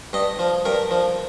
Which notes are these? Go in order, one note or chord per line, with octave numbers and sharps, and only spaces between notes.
G2 D#5
F3
G2 A#4
F3